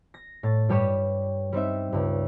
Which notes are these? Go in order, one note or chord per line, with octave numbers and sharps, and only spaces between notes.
A#6
A2 A6
G2 G3 G4 B4 C#5 E7
G3 C4 D#4 E5
C#2 G2